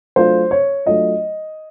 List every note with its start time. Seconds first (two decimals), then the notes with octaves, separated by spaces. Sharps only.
0.16 F#3 A3 D4 F4 C5
0.51 C#5
0.86 F#3 A3 D4 F4 D#5